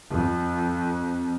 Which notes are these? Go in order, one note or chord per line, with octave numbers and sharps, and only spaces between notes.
F2